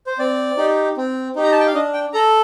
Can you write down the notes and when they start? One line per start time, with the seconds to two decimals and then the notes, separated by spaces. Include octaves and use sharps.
0.07 C5
0.19 C4 D5
0.57 D#4 G4
0.97 C4
1.36 D#4 G4
1.44 A#5
1.52 A5
1.59 G5
1.66 F5
1.74 D4 D#5
1.94 G5
2.13 A4 A#5